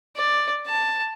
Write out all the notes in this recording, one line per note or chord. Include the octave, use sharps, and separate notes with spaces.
D5
A5